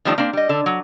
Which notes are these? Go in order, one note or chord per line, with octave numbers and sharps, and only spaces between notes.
D3 D#3 F3 G3 A3 D#4
A#3 C4 D4
G3 D#5
D3 A4
F#3